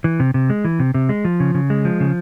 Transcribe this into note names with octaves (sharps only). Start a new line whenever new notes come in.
E3
C3
C3
G#3
E3
C3
C3
G#3
F3
C#3
C#3
G#3
F3
C#3